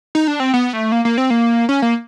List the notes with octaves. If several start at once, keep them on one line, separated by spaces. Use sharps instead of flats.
D#4
D4
C4
B3
A3
A#3
A#3
C4
A#3
C#4
A#3